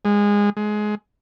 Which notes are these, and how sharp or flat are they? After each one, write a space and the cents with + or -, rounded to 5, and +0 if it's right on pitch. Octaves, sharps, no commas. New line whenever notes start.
G#3 -20
G#3 +20